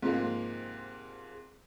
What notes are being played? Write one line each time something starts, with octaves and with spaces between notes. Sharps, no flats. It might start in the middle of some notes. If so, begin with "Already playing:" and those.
G#2 C3 F3 G#3 A#3